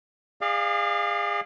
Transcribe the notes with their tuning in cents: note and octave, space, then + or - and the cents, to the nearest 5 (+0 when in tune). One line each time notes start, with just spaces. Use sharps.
G#4 -25 D5 +40 F5 +0